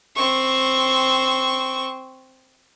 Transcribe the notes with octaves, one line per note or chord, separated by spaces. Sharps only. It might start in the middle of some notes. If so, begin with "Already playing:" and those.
C4 C#6